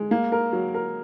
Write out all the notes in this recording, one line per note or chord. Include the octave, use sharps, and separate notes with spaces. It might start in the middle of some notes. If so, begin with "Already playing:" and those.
Already playing: G#3
A#3
A#4
F#3
A#4